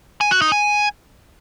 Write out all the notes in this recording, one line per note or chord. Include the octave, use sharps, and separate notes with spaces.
G#5
F#4
D#4
G#5